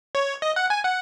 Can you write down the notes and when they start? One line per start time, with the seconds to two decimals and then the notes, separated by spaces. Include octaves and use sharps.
0.15 C#5
0.42 D#5
0.56 F#5
0.70 G#5
0.84 F#5